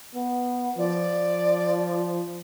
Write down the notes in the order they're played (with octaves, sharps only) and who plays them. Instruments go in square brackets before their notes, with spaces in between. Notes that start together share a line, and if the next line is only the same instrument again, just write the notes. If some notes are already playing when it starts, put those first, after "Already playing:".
[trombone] B3
[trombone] F3 [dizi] D5